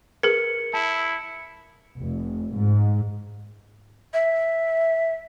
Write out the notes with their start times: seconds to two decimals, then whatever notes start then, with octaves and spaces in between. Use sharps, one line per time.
0.23 G#4 A#4 B4 C#7
0.74 E4 A5
1.98 F1
2.54 G#2
4.14 E5